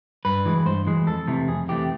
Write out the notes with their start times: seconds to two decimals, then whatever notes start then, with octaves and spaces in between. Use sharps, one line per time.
0.25 G2 B4
0.46 E3 G#3
0.66 G2 C5
0.87 E3 G#3
1.07 F2 A4
1.28 C3 E3 A3
1.48 F2 G#4
1.68 C3 E3 A3 G4